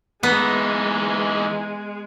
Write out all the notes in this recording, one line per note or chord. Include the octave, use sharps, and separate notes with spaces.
E3 G#3 B3 D#4